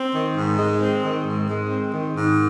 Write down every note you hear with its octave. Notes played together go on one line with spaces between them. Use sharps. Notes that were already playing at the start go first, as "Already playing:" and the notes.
Already playing: C4
D#3
G#2
G#3
C4
D#3
G#2
G#3
C4
D#3
G#2